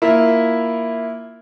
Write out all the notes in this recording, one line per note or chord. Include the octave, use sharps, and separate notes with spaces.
A#3 E4 F4 E5